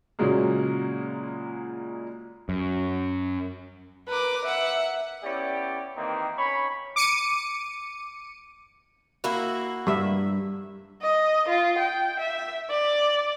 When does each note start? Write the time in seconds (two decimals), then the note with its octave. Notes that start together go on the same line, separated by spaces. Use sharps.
0.19 A#2 C#3 F#3 G#3 A#3
2.49 F#2
4.08 A#4 B4 D6
4.46 E5 F#5
5.24 B3 C#4 E4 G4 D5
5.97 D#3 E3 A#3 C4 D#4
6.38 C#4 C#5 B5
6.96 D6 C#7 D#7
9.24 A#3 E4 F#4
9.87 G2 E5
11.02 D#5
11.49 F4
11.79 G5
12.20 E5
12.70 D5